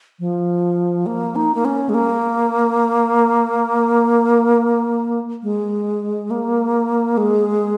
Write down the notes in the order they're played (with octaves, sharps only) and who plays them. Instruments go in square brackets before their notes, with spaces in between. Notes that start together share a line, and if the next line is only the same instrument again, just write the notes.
[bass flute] F3
A#3
D#4
A#3
C#4
G#3
A#3
G#3
A#3
G#3